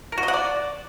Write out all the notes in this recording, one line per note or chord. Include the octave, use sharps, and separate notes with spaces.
A#4
F#4
D#5
F#5
D5